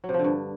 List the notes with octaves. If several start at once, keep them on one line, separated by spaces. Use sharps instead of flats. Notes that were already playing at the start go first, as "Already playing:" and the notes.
F#3
C3
F3
D3
G2